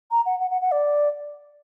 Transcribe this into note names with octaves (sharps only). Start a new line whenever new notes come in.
A#5
F#5
F#5
F#5
F#5
D5